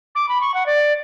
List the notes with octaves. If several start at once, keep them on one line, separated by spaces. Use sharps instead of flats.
D6
B5
C#6
F#5
D5